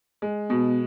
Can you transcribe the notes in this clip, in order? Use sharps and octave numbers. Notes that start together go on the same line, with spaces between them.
G#3
B2 B3